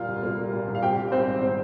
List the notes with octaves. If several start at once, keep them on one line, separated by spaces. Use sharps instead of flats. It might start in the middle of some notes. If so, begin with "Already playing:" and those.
Already playing: A#2 G3 A#3 F4 F5
C2
A#3
G3
A#2
C2
F5
C4 G4 G5
G3
G#2 C4 C5
G#1
C4